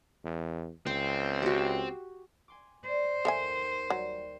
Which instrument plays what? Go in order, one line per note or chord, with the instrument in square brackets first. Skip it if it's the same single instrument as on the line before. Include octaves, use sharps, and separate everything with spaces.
[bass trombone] E2
[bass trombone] C#2 [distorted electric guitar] C4 [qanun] C5
[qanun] F#4 G4
[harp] G#5 C6 D6
[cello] C5 [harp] D5
[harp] D#2 D6 G6 [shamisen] A4 E5 G#5
[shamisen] F#3 [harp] G3